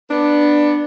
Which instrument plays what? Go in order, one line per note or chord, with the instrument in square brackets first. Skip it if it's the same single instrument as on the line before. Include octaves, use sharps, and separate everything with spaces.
[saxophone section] B3 D4